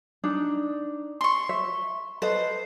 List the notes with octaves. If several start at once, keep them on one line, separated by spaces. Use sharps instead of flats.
D4 D#4
C6 C#6
E5
A4 B4 C5 D#5